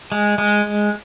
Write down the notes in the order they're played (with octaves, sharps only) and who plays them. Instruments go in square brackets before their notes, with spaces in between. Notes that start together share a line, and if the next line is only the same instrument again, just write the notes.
[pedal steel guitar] G#3
G#3